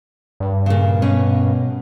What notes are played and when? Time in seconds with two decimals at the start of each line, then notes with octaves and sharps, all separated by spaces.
0.40 G2
0.66 A#2 C#3
1.02 B2 C#4